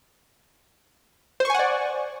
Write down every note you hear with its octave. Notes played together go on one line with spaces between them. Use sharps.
C5 D5 F#5 G#5 C#6